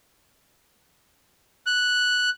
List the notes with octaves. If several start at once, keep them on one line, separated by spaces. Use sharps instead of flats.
F#6